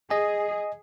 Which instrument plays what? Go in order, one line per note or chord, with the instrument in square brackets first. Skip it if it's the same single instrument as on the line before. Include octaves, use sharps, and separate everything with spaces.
[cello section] G#4 [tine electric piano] D#5 G#5